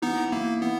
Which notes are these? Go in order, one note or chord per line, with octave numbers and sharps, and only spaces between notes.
E3 B3 D#4
A#3 E4
E3 B3